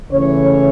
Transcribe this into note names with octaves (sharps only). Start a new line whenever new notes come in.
C#3 E3 A3 C#5